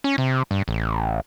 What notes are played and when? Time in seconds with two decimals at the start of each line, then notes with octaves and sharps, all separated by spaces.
0.04 C#4
0.18 C3
0.51 G2
0.68 A1